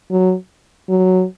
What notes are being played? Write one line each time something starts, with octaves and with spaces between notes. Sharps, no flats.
F#3
F#3